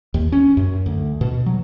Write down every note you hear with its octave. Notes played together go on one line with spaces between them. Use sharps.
D#2
C#4
F#2
D2
B2
F#3